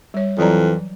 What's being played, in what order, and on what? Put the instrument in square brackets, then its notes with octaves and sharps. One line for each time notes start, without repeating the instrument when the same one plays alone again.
[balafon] G3 C#5
[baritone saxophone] F2 [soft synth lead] E3 [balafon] F#3 D5 A#5